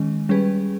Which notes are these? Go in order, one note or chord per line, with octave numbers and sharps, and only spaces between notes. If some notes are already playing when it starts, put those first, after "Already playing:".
Already playing: D#3 G#3 C#4
G3 C#4 G#4 B4